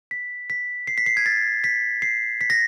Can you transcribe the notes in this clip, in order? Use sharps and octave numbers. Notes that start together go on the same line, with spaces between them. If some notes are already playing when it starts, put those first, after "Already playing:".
B6
B6
C7
B6
C7
G#6
A6
B6
C7
B6
A#6